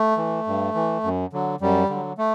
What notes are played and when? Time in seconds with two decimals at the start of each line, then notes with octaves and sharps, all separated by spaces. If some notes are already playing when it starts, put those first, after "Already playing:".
Already playing: A3
0.17 E3
0.47 G2
0.75 E3
1.04 F#2
1.33 D3 F#3
1.61 F#2 G3
1.90 D3 F#3
2.18 A3